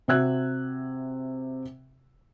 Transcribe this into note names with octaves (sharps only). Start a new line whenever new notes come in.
C3 F#4 E5 E6 F#6 G#6